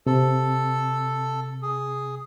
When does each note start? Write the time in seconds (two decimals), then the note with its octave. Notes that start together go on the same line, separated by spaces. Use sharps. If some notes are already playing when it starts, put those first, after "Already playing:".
0.07 C3 A4
1.63 G#4